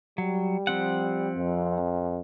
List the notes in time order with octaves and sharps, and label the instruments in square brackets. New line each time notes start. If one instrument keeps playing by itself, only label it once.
[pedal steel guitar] F#3 [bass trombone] G3
[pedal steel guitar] F3 C4 F#5
[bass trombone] F2